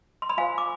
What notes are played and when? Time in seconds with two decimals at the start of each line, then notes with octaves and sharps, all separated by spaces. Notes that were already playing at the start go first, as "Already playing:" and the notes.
0.22 C6
0.29 B5
0.37 F4 C5 F5 G#5
0.58 D6